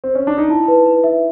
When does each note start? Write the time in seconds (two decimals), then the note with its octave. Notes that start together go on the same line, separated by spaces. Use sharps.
0.04 C4
0.15 C#4
0.27 D4
0.38 D#4
0.49 E4 A5
0.68 B4
0.86 B4
1.04 E5